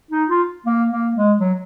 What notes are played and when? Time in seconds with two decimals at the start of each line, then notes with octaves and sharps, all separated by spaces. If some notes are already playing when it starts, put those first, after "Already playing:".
0.11 D#4
0.29 F4
0.66 A#3
0.91 A#3
1.15 G#3
1.39 F#3